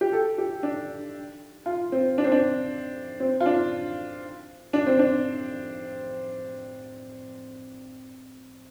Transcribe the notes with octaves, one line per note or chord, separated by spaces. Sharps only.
G4
A4
G4
D4
F4
C4
D4
C4
D4
C4
F4
D4
D4
C4
D4